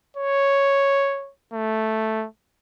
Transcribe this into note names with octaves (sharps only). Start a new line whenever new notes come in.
C#5
A3